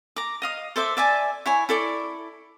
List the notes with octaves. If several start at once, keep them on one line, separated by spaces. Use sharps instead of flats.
A#5 D6
D#5 F5 D#6
A4 C5 E5 D6
D5 E5 G#5 A5
E4 C#5 G#5
E4 A4 D5 C#6